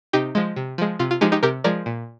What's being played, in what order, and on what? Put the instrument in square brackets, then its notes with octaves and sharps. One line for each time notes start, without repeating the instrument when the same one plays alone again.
[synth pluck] C3 D#4 G4
F3 G#3
C3
F3 G#3
C3 F4
F4
F3 G#3 D#4 G4
D#4 G4
C3 G4 A#4
F3 G#3 A#4 D5
A#2